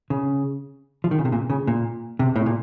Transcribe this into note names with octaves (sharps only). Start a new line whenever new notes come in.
C#3
F3
D#3
C#3
C3
A#2
C#3
A#2
C3
A2
A#2